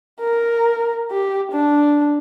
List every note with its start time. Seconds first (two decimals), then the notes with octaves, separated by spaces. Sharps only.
0.20 A#4
1.11 G4
1.52 D4